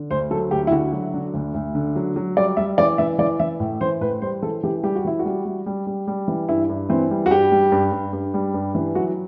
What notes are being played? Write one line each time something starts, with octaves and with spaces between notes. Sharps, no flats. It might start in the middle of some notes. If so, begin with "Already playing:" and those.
Already playing: D3
D2 C5
F#3 A4
D2 G4
E4
D3 F#4
F#3
D3
D2
D2
D3
F#3
F#3
G3 D5
G3 E5
E3 D5
E3 E5
E3 D5
E3 E5
A2
E3 C5
A2 B4
G3 C5
E3 A4
E3 G4
G3 G4
F#4
E3 E4
F#4
G3
G3
G3
G3
G3
E3
G2 E4
G2
E3 C4
G3
F#4
G2 G4
G3
G2
G2
G2
G3
G2
E3
F#3 F#4